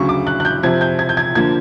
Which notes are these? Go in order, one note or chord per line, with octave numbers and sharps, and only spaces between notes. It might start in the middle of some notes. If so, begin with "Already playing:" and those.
Already playing: D2 C#3 F#3 C#6
D6
F#6
F#6
G6
F2 C3 F3 G#6
G6
G#6
G6
G#6
D3 F3 A#3 G#6